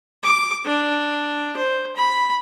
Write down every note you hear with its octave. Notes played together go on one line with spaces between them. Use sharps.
D6
D4
C5
B5